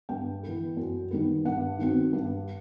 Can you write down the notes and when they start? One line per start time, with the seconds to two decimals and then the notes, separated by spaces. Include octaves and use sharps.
0.09 G2 G5
0.43 E3 B3
0.77 F#2
1.11 D#3 G3 B3
1.45 G2 F#5
1.78 D#3 F#3 C4
2.13 G2